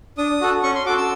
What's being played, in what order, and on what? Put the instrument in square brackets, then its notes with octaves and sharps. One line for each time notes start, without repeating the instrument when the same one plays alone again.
[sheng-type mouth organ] D4 D#6
F#4 A4
C#4 C#6
C6
F#4 D6
A4
E6